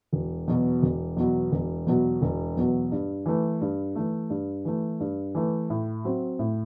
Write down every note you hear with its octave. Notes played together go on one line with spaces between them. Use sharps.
E1
E2 B2 F#3
E1
E2 B2 F#3
E1
E2 B2 F#3
E1
E2 B2 F#3
G2
E3 A3
G2
E3 A3
G2
E3 A3
G2
E3 A3
A2
F#3 C4
A2